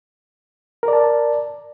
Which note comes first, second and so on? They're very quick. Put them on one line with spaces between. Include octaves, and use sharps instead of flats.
A#4 D5 A5